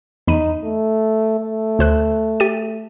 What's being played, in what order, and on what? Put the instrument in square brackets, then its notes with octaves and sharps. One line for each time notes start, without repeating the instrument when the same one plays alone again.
[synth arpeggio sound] E2 B5 D#7 [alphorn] D#4
[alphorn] A3
A3
[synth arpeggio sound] D2 C5 F#6
G4 A6 D#7